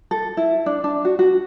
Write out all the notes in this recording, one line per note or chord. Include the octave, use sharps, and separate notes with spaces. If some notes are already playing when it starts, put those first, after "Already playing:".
A4
E4
D4
D4
F#4
F#4